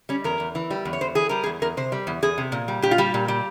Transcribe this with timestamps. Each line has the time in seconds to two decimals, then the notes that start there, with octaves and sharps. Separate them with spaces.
0.09 G3 C#4
0.24 E2 A#4
0.40 E2
0.55 E3
0.71 G3
0.85 E2
0.93 C#5
1.01 E2 C5
1.15 E3 G#4
1.29 G3 A#4
1.44 G#4
1.46 E2
1.62 E2 A#4
1.77 C3 C5
1.92 G3
2.07 E2
2.22 E2 G#4
2.38 C3
2.52 A#2
2.68 G3
2.82 A#2 G4
2.91 F4
2.98 G3 G4
3.14 A#2
3.28 G3